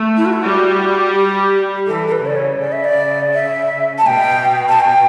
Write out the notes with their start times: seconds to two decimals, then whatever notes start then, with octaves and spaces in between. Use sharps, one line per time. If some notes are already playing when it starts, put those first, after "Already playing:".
Already playing: A3
0.17 E4
0.26 F#4
0.33 E4
0.42 G3 F#4
1.14 G4
1.87 E3 A4
2.08 A4
2.12 B4
2.25 C#3 D5
2.36 C#5
2.61 C#3 D5
2.72 E5
2.85 D5
3.34 E5
3.98 A5
4.06 B2 G5
4.69 A5
4.80 G5